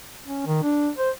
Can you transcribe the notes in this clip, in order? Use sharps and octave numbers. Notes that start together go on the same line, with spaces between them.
C#4
D#3
D4
C5